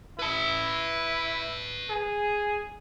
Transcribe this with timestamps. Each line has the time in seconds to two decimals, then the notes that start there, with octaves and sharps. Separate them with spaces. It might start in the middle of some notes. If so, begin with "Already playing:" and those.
0.19 E4 B4 A5
1.90 G#4